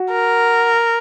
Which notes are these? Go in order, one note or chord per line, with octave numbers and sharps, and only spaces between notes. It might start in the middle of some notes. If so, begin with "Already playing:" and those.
Already playing: F#4
A#4